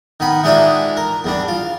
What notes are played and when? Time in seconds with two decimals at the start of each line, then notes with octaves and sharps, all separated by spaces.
0.20 D#3 B3 B5
0.43 E3 G#3 D4 D#4 F4 E5
0.97 A#4
1.24 E2 G3 D4
1.48 F4